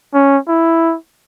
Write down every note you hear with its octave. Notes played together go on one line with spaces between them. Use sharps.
C#4
E4